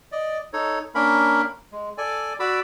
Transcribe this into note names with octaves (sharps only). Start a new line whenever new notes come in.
D5 D#5
D#4 A4 C#5
A#3 C#4 D4 A#4 B5
G#3
A4 D5 G#5
F#4 D5 B5 D6 E6